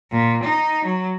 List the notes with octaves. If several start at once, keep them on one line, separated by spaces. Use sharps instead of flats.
A#2
D#4
F#3